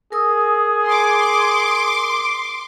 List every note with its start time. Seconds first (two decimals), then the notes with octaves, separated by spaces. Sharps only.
0.12 G#4 A#4 D#6 E6
0.86 C6 D6